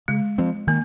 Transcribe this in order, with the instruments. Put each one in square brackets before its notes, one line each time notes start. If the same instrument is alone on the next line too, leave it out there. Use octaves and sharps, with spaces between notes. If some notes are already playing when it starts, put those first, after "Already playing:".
[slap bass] C#3 [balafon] G#3
[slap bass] F3 C4
[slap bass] D#3 [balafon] A#3